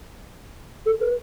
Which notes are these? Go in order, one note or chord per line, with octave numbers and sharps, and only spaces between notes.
A4
B4